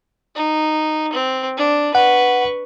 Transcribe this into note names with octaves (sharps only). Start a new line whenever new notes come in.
D#4
C4
D4
B4 F#5 C#6